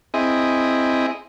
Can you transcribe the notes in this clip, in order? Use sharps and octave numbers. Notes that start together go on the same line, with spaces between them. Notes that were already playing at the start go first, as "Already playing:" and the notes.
C4 E4 G#4 D#5